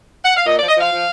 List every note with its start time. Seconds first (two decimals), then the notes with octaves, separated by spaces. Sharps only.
0.24 F#5
0.36 F5
0.46 A#2 D#5
0.57 F3 D5
0.69 D#5
0.76 F3 F5
0.91 F3